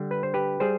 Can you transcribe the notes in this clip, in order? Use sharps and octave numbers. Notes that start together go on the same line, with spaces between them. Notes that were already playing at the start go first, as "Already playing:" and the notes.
Already playing: D3 G3
B4
C5
G4 B4
G3 G#4 C5